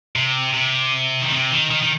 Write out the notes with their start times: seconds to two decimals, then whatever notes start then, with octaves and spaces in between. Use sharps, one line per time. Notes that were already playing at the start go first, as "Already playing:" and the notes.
0.16 C3
0.54 C3
1.22 D#3
1.32 C3
1.52 D#3
1.71 D#3
1.83 D#3